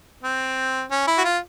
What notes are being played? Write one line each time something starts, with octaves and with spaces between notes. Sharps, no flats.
C4
C#4
E4
F#4
F4